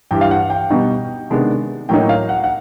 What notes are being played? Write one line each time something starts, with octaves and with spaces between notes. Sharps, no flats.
G2 E3 G3 G5
F5
F#5
G5
B2 G3 B3 D#4
C3 D#3 G#3 B3 D4
A2 F#3 A#3 D#4 G5
F5
F#5
F#5